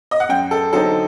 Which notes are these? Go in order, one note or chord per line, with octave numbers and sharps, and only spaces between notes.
D#5
F#5
F#2 G5
A4
D3 F#3 C4 D#4 A4